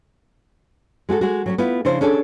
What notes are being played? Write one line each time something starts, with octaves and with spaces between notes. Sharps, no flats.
G#3 F#4 G4 A4
G#3 F#4
F#3 G3 C#4
B3 E4 F4
C#3 F3 D4 E4 C5
C#4 D4 G#4 A4